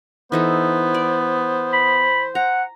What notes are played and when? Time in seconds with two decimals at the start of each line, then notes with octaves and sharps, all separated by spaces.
0.32 E3 B3 D#4 A4 C5
0.95 D5
1.73 B5
2.35 F#5 A#5